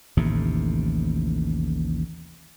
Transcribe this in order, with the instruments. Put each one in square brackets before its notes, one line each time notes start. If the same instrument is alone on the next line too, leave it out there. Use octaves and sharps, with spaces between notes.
[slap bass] A1 D#2 A2 C3